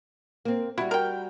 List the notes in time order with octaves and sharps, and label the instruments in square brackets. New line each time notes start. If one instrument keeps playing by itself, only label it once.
[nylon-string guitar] A#3 C4
[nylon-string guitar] G3 F#4 [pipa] E4
[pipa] A#4 G5